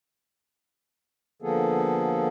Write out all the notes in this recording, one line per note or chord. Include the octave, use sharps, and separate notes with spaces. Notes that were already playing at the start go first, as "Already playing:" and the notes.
D3 F3 A#3 B3 G#4 A4